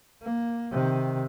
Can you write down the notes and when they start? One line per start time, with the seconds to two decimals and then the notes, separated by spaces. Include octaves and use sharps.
0.22 A#3
0.72 C3 D#3